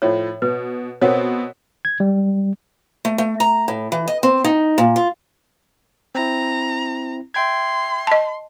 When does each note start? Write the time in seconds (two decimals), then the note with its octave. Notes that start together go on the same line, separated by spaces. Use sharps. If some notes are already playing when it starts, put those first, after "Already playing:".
0.02 A2 F3 C#5
0.42 B2 B4
1.01 B2 B3 C4 A#4 C#5
1.85 G#6
2.00 G3
3.05 A3
3.18 A3
3.40 A#5
3.68 A2
3.92 E3
4.08 D#5
4.23 C4
4.45 D#4
4.78 A#2
4.96 F4
6.15 C4 E4 A#5
7.34 E5 G5 C6 G#6
8.07 D#5 A5